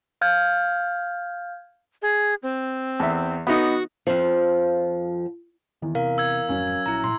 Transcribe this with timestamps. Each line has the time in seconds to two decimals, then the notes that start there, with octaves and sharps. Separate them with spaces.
0.21 F5 F6 G6 G#6
2.02 G#4
2.43 C4
3.00 E2 E5
3.47 B3 D#4 F#4
4.07 F2 F3
5.82 E2 D#3
5.95 C3 A#4 F5
6.18 E6 G#6
6.49 G#1 F2 F#3 C#4
6.86 A#1 E4 A#5
7.04 A1 A#2 C6